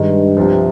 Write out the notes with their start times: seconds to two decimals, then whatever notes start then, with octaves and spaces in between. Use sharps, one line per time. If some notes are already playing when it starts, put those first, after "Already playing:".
Already playing: G2 D#3 G#3 D#4
0.37 C2 C3 F3